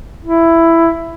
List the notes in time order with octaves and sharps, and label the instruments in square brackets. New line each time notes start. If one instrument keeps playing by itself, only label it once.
[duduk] E4